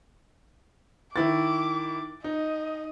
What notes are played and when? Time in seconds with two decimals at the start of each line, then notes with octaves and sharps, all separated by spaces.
1.16 D#3 E4 D6 A6
2.24 D#4 D#5